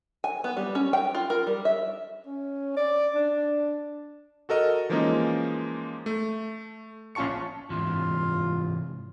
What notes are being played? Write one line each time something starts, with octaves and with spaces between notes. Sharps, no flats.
G#5
B3
G3
C#4
G5
F4
A#4
G3
E5
C#4
D5
D4
F#4 A4 A#4 D#5
E3 F3 G#3 A#3 C#4 D#4
A3
A#1 C#4 F4 A5 C#6 C#7
G#2 C3 E3 F4